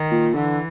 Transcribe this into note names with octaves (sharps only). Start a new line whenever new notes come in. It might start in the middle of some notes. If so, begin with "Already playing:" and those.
Already playing: D#3
A#2
D3 E3